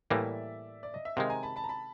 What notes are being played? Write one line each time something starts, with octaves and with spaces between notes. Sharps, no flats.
A2 E3 G3 A#3 D5 E5
D5
D#5
E5
C3 D#3 G#3 D#5 F5
G#5 A#5
A5 B5
A5 B5
A#5
A5 B5